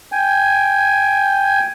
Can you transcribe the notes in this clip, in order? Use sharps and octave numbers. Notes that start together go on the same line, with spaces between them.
G5 G#5